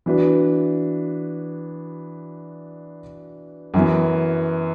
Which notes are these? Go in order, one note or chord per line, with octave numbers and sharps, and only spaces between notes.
E3 B3 D4 F#4 B4
F#2 E3 B3